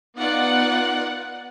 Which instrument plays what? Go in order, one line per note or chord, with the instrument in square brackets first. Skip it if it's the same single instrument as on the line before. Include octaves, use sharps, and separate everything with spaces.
[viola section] B3 D#4 F4 D5 F#5